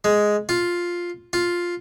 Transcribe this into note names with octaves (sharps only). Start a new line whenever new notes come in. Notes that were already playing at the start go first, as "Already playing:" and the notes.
G#3
F4
F4